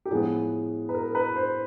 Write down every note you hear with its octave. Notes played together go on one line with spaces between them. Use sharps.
G4
A2 F3 G#3 B3 G#4
B4
A#4
A#4
B4
C5